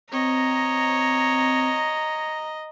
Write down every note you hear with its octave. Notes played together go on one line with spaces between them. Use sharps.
C4 C#5 D#5 A#5